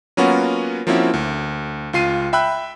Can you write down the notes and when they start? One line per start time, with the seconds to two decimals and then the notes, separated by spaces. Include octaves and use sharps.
0.17 F#3 A#3 B3 C#4 F4 F#4
0.87 F3 A#3 C4 C#4 E4 F#4
1.14 D2
1.93 C#2 F4 C7 D#7
2.33 E5 G5 B5 E6 F#6